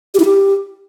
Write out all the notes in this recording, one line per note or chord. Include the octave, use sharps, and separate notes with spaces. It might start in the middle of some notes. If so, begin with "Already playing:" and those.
G4
E4
G4